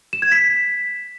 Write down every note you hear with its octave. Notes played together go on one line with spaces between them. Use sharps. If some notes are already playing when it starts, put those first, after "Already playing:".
E7
G#6
B6